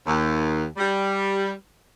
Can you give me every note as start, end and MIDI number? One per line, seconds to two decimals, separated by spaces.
0.06 0.64 39
0.77 1.51 55